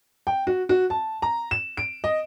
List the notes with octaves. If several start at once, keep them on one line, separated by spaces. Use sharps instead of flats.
G5
F#4
F#4
A5
A#5
E7
D7
D#5